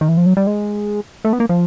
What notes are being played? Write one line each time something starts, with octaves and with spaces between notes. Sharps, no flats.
D#3
E3
F3
F#3
G3
G#3
A3
B3
A#3
F3